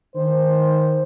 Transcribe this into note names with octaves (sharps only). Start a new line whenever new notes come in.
D#3 C5